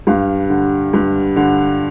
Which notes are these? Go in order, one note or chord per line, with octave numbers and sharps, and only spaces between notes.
G2 F5
D3
G2
D3